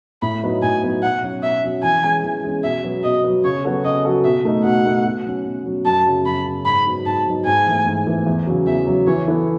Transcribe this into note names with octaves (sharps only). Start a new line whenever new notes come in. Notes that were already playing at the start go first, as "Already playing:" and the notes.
A2 B5
F#3 B3 D#4
A2 G#5
F#3 B3 D#4
B2 F#5
F#3 C#4 F#4
B2 E5
F#3 C#4 F#4
E3 G#5
G#3 C#4
E3
G#3 C#4
B2 E5
F#3 B3
B2 D#5
F#3 B3
C#3 C#5
F#3 B3 F#4 A4
C#3 D#5
F#3 B3 F#4 A4
B2 E5
A3 D#4
B2 F#5
A3 D#4
B2
F#3 C#4
B2
F#3 C#4
F#2 A5
C#3 F#3
F#2 B5
C#3 F#3
G#2 B5
F#3 B3 D#4
G#2 A5
F#3 B3 D#4
G#2 G#5
E3 A3
G#2
E3 A3
E2
C#3 F#3
E2 E5
C#3 F#3
E3 C#5
B3 E4 A4